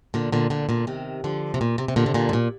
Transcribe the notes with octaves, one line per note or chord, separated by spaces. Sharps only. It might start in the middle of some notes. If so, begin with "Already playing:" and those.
A#2 D3
A#2 D3
A#2 D3
A#2 D3
C3 D#3
D3 F3
C3
A#2
C3
C3
A#2 D3
C3
A#2 D3
G#2
A#2